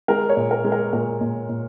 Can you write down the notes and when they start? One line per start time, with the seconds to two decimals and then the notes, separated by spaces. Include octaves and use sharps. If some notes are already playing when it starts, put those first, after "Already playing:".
0.08 G#3 A#4
0.29 C#5
0.37 A#2
0.51 A#4
0.64 G#3
0.72 A#4
0.93 A#2 A#4
1.21 A#2
1.49 A#2